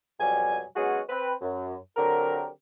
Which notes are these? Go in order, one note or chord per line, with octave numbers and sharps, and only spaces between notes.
F2 B2 F#3 G3 G#5
F#3 G#3 B3 C#4 F#4 G#4
C4 B4
F#2
D3 F#3 C4 G4 A#4